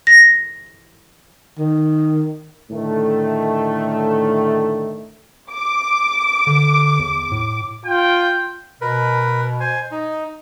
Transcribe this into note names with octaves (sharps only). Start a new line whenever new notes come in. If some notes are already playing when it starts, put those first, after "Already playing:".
A#6
D#3
A2 D3 D#3 A3
D6
D3
E2
A2
F4 G5
B2 A#4 B4
C5 G#5
D#4